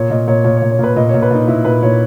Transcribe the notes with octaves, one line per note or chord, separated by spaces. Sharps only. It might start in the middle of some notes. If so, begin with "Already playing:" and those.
Already playing: A#2 C#5
A#2 D#5
A#2 C#5
A#2 C#5
C#5
A#2
C#5
A#2 B4
A#2 D#5
A#2 C#5
B4
A#2 D#4
A#2 E4
A#2 B4
A#2 C#5